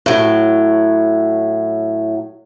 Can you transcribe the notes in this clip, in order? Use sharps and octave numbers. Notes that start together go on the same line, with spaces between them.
A2 F#3